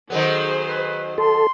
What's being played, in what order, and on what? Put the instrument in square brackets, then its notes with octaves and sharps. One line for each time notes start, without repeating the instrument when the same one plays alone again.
[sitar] D#3 F#3 B3 [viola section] G#4 A4 C5
[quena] B4
[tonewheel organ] A4 [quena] C6